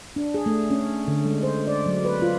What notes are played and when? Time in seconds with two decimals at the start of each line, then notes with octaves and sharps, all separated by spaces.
0.16 D4
0.34 G#4
0.46 A3
0.70 C#4
1.08 D3
1.25 G#3
1.43 C5
1.67 D5
1.86 F#3
2.05 B4
2.22 F4